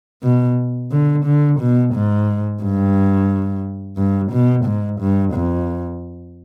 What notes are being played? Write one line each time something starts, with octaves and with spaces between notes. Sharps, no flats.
B2
D3
D3
B2
G#2
G2
G2
B2
G#2
G2
F2